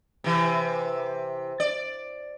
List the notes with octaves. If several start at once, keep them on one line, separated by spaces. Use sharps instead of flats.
C3 E3
D5